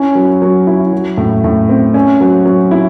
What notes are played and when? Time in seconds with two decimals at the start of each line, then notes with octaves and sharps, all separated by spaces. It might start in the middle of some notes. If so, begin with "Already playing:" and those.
Already playing: C#4 E4
0.15 F#3
0.42 F#3
0.67 E4
0.93 F#3
1.17 A2
1.44 A2
1.69 C4
1.94 C#4
2.21 F#3
2.46 F#3
2.71 E4